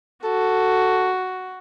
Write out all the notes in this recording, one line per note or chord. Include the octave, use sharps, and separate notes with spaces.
F#4 A4